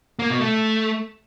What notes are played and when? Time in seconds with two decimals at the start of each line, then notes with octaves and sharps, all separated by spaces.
0.19 A#3
0.30 B2
0.41 A3